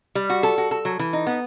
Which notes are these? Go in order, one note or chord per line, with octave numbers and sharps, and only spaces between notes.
G3
F#4
A4
F#4
A4
F#3
E3
D#4
B3